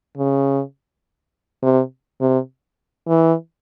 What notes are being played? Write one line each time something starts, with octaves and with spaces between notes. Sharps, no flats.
C#3
C3
C3
E3